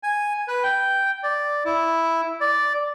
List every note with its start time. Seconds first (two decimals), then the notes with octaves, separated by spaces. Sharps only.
0.03 G#5
0.48 B4
0.64 G5
1.23 D5
1.65 E4
2.41 D5